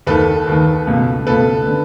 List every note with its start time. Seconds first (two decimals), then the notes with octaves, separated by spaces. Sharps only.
0.07 D#2 D#3 A4 B4
0.47 D#2 D#3
0.87 C#2 B2
1.27 C#2 B2 A4 B4
1.67 D3